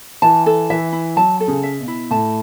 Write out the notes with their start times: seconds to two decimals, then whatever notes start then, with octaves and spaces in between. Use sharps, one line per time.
0.22 E3 A5
0.46 A4
0.70 E3 E5
0.93 E4
1.16 F#3 A5
1.40 A4
1.48 C#3
1.63 E5
1.80 B2
1.88 E4
2.11 A2 A5